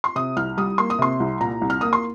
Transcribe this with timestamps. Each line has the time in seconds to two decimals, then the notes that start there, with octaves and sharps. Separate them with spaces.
0.04 C6
0.16 C3 D#6
0.36 C2 F6
0.57 G3 D#6
0.78 A#3 C6
0.90 D#6
0.99 C3 C6
1.20 C2
1.41 A#2 A#5
1.61 C2
1.70 F6
1.81 A#3 D#6
1.93 C6